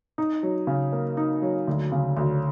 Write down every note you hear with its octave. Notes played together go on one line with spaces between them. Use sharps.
D#4
F#3
C#3
A#3
D#4
F#3
D2
C#3
D2